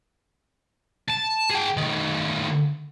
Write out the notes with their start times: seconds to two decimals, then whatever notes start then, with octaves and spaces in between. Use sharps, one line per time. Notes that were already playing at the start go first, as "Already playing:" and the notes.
1.10 A5
1.51 G#4 G5
1.77 D#3 A3